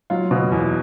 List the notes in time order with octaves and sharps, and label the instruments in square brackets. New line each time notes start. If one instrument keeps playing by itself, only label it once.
[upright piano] F#3 F4
B2
E2